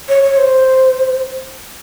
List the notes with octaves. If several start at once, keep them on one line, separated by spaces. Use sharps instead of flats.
C#5
C#5
C5